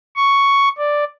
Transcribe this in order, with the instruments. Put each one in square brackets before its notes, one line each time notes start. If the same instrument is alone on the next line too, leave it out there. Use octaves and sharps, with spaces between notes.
[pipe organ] C#6
D5